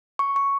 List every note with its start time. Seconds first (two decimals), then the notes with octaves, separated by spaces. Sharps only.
0.19 C#6
0.36 C#6